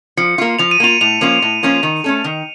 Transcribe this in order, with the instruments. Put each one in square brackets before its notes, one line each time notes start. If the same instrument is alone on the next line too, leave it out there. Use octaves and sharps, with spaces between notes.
[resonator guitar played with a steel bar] F3 [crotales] C#7
[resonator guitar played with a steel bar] A#3 F4
[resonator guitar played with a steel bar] F3 [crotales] F7
[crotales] D#7
[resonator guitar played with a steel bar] A#3 F4 [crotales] F7
[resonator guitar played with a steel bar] A2 [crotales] F7
[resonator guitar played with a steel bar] F3 A#3 C#4 F4
A2
F3 A#3 C#4 F4
D#3
A3 C#4 A4
D#3